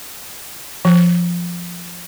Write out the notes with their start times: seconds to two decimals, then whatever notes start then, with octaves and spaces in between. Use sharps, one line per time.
0.85 F3